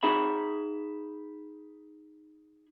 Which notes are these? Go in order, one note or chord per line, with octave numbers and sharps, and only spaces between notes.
D#4 G#4 E5 B5